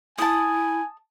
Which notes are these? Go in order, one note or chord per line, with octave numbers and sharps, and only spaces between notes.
E4 G#5 A5 D#6